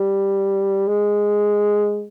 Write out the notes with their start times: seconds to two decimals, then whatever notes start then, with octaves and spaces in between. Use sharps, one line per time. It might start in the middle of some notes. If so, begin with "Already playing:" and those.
Already playing: G3
0.87 G#3